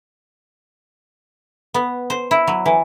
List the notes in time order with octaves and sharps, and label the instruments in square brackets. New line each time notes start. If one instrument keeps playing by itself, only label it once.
[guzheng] B3
C5
E4
F#3
E3